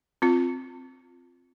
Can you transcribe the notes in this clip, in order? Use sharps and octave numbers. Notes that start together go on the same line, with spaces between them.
C4 F4